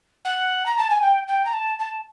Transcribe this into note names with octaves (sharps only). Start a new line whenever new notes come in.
F#5
A#5
A5
G#5
G5
G5
A#5
A5
A5